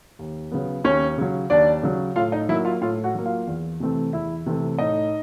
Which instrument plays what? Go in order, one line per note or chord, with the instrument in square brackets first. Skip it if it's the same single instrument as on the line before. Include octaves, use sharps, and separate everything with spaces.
[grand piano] D#2
C#3 F#3 B3
D#2 C#4 C#5
C#3 F#3
D#2 D4 D5
C#3 F#3
A2 F4 F5
D#4 D#5
F#3 A#3 E4 E5
F4 F5
A2 F4 F5
F#4 F#5
F#3 A#3
F4 F5
E2
C3 E3 A3 C4
E2 E4 E5
C3 E3 A3 C4
A2 D#4 D#5